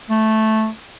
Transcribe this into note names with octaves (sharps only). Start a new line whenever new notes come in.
A3